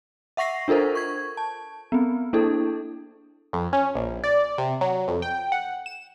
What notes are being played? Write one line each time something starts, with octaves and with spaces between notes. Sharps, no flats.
E5 F#5 C#6 A#6 C7
D4 F4 A4 A#4 C5
C#6 G#6
A5
B3 C4
A#3 D4 E4 A4
F2
C#4
A#1
D5
C3
F#3
F2
G5
F#5
E7